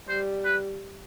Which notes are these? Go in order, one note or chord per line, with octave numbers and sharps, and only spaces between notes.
G3 C5
B4